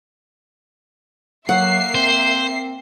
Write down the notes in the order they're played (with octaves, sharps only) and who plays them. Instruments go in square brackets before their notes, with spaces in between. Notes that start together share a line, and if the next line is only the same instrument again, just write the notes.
[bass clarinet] F#3 [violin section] A#3 E5 C7 [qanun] F#5
[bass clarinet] C4 [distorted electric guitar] C5